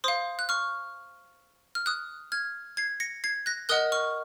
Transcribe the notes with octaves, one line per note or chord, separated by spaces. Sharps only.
C5 F5 C6 D#6
F#6
C#6 F6
F6
D#6 F#6
F6 G#6
G#6 C7
A#6 C#7
G#6 C7
F#6 A#6
A#4 D#5 F#5 D#6 F#6
C#6 F6